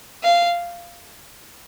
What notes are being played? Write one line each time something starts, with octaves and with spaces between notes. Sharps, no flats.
F5